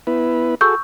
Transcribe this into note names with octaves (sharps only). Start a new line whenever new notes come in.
B3 E4 B4
F#4 G#4 A4 C#6 E6 G6